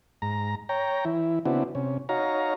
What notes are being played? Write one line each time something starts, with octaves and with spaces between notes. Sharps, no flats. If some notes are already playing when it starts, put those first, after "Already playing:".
G#2 A#5
C#5 G5 A#5
E3 E4
C#3 B3 C4 D4 E4 F#4
C3 C#4
D#4 F#4 C#5 F5 A#5